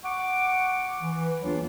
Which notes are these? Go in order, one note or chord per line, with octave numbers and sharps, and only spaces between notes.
F#5 C#6 D6
E3
E2 E3 F#3 A#3 D4 F4